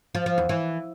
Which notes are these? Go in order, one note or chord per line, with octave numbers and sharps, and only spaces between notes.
F3
F3
E2
E3